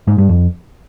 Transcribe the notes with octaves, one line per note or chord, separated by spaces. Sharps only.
G#2
G2
F2